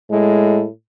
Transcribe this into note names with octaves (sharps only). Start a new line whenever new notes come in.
A2 G#3